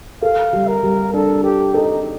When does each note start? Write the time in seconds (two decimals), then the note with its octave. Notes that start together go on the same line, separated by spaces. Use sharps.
0.22 A4 F5
0.53 G3
0.68 A#4
0.83 G3
1.13 D4 A4
1.43 G4 A4
1.74 D#4 A4